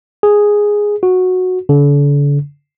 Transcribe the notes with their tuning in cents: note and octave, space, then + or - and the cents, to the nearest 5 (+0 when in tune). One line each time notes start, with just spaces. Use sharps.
G#4 -5
F#4 -10
D3 -40